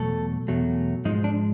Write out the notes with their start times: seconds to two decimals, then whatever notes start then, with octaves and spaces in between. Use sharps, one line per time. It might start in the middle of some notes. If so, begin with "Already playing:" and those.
Already playing: E2 B2 F#3 A3 A4
0.48 E2 B2 F#3 A3
1.05 G#2 F3 G#3 D#4
1.24 D4